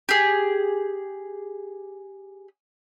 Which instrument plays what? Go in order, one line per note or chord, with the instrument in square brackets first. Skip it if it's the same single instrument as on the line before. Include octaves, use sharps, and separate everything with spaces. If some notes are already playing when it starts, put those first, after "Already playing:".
[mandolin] G4 G#4